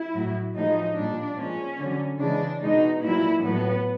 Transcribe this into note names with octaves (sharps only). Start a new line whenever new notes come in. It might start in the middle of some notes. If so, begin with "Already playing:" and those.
Already playing: E4
A2 F#3
A2 F3 G#3 D#4
A#2 G3 D4
A#2 F3 G#3 C#4
D3 F#3
C#3 E3 G#3 D4
B2 G#3 D#4
A#2 F#3 E4
A2 F#3 B3